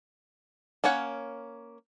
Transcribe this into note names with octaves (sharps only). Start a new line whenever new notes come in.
A#3 C#4 C#5 F#5